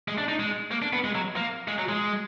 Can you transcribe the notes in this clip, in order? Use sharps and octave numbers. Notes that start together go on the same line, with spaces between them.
G#3
D4
D#4
G#3
A#3
D4
B3
G#3
F#3
A#3
G#3
F#3
G#3